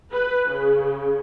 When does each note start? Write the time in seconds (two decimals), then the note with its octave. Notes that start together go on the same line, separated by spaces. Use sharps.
0.12 B4
0.51 C#3